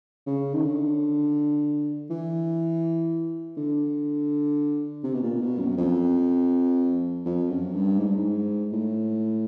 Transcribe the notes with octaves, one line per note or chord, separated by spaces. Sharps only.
C#3
D#3
D3
E3
D3
C3
B2
A#2
B2
F#2
F2
F2
F#2
G2
G#2
G2
G#2
A2